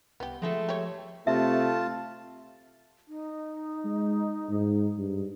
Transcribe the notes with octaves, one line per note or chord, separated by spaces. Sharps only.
C2 B3 G4
F3 G#3 A3 A4
G4 C#5
C3 A3 F4 E5 A5
D#4
G#3
G#2
G2